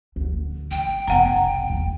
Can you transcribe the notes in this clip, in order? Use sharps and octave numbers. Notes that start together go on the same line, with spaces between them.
D2 D3
G#1 G5
F1 B1 B3 F#5 A#5
E2 D#3